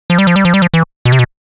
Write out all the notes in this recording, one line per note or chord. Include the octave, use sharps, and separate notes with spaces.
F3
G3
F3
G3
F3
G3
F3
E3
B2
C3
B2